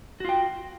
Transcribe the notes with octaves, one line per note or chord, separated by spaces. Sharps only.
F4 F#4 G5